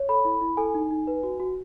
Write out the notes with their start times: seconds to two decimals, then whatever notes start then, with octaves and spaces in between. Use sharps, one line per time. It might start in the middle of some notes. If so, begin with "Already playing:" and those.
Already playing: C#5
0.09 A4 B5
0.25 E4
0.41 E4
0.57 A4 G#5
0.74 D#4
0.91 D#4
1.07 B4
1.23 F#4
1.40 F#4